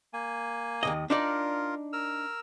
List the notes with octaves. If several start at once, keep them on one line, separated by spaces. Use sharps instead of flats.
A#3 G#5
D#2 A#2 D#5
D4 D#4 F4 A#4 D5
A#4 E6 F6